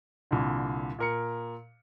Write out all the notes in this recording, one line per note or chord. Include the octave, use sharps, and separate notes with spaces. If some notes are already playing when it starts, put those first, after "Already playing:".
C2 A#2 D3
A#2 A#4 C#7